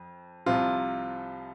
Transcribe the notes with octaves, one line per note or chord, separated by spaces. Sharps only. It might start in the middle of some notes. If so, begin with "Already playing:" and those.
Already playing: F2
C2 C3 F3 F4